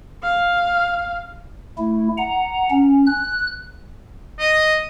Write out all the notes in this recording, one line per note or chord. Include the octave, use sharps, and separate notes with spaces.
F5
A3 E4
F#5 A#5
C#4
F#6
D#5